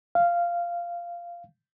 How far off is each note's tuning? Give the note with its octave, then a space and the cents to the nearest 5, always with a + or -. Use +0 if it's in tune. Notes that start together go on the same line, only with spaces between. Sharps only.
F5 -10